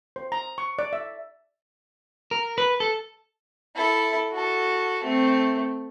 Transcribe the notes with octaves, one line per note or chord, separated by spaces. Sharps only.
C5
A#5
C#6
D5
E5
A#4
B4
A4
E4 A4
F#4 A4
A3 C4